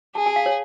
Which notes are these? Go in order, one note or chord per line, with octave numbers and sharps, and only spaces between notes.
G#4 A5
G#5
F5
C#5